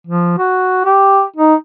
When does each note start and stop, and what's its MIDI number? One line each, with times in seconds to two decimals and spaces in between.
0.07 0.37 53
0.38 0.83 66
0.85 1.23 67
1.36 1.55 63